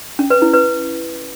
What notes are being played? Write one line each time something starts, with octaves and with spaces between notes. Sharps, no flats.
C#4
B4
E4
B4